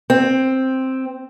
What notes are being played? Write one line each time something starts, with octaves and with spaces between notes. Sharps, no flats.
C4